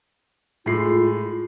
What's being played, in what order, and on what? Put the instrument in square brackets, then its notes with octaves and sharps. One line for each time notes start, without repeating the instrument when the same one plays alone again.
[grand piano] A2 G#3 C7 [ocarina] F4